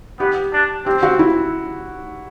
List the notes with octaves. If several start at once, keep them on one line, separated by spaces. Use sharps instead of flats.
B3 G4
D4
C4 G4
F#4
E4